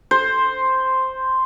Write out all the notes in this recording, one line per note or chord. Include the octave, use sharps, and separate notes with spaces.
C5